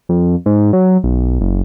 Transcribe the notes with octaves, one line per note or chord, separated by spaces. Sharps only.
F2
G#2
F#3
B1
F#1